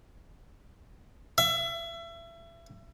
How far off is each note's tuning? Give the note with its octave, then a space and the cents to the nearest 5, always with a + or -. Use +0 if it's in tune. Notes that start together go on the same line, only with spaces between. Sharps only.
E5 +30